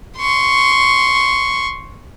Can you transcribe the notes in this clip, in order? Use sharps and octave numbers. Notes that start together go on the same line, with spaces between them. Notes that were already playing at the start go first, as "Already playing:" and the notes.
C6 C#6